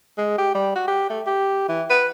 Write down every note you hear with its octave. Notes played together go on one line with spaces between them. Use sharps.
G#3
G4
G3
F#4
G4
A3
G4
E3
B4